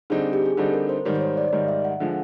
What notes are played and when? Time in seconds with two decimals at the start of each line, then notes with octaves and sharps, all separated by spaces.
0.10 D3 G3 C4 D#4 G#4
0.33 G4
0.46 G#4
0.57 D3 G3 C4 D#4 A4
0.73 A#4
0.89 C5
1.05 G#2 D#3 G3 C#5
1.15 C5
1.21 C#5
1.37 D5
1.48 D5
1.52 G#2 D#3 G3 D#5
1.68 E5
1.85 F#5
2.00 D3 F3 G#3